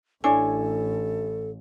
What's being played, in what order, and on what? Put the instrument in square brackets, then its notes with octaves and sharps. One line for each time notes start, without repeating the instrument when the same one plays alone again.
[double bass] A1 [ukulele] D4 E4 C#5 [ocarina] A4 [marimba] G#5